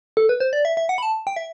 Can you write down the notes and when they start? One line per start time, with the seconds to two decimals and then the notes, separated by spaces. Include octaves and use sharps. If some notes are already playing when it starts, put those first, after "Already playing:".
0.17 A4
0.29 B4
0.40 C5
0.53 D5
0.65 E5
0.77 E5
0.89 F#5
0.98 B5
1.03 A5
1.27 G5
1.36 E5